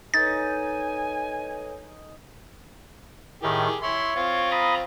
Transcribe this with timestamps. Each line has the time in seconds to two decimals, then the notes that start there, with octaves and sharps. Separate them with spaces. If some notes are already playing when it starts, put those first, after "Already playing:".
0.14 D#4 A4 B4 C#5 G#5 A6
3.43 A2 D#3 G4 G#4
3.83 E4 C#5 C6
4.16 C4 F4
4.52 A#5 B5 D#6